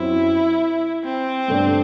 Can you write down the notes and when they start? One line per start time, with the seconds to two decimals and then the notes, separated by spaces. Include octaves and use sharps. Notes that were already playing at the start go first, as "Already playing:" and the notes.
Already playing: F#2 F#3 C4 E4
1.04 C4
1.48 G2 D3 A3 D4